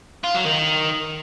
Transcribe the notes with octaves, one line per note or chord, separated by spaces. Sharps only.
F4
F#3
D#3